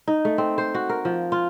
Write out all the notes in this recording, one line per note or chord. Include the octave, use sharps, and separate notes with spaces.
D#4
A3
C4
C5
F#4
A#4
F3
F4